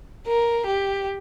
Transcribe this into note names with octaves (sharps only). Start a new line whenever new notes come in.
A#4
G4